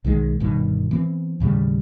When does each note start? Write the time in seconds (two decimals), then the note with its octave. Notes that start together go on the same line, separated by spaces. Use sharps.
0.04 B1 D#3 F3 G#3
0.40 G1 G2 B2 D#3
0.91 E3 B3 C4
1.40 D#2 A2 C#3 G3